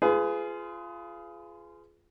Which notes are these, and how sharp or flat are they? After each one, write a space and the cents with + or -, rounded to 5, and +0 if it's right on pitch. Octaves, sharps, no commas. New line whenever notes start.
F4 -20 G#4 +15 B4 +25